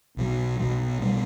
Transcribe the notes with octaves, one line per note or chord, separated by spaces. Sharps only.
B1 B2 F#3
B1 B2 F#3
B2 G3